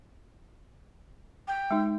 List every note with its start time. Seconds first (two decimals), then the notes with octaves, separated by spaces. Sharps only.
1.48 G5
1.71 G#3 D#4